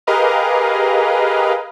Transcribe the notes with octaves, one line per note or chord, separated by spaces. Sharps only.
G4 G#4 A#4 B4 D#5 F5